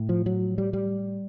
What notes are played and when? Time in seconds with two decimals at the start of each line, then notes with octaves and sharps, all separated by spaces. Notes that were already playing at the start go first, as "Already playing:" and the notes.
Already playing: A2
0.09 F3
0.26 F#3
0.58 G3
0.73 G3